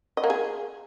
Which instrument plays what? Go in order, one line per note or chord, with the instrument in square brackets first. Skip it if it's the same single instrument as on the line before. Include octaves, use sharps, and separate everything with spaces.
[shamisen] D#5
A#3
G#4